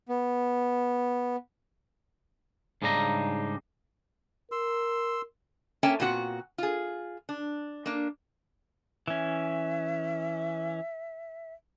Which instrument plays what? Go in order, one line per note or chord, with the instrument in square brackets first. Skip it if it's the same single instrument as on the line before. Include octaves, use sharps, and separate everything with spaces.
[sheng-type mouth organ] B3
[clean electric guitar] G#2 C#3 G3 D4 D#4 A#5
[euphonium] A#4 [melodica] C6 E6
[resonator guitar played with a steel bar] A#3 C#4 A4 E5 G5 A5
A#2 B3 C4 F#4 C5 F#5
F4 G#4
D4
A#3 D4
[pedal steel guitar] E3 C#4 [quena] E5